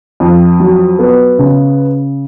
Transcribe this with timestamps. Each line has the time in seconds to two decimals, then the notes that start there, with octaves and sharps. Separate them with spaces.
0.20 F2
0.60 F#3
0.99 B3
1.39 C#3